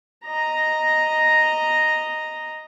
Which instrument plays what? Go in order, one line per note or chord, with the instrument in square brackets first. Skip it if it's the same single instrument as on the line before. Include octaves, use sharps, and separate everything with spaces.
[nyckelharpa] D#5 A#5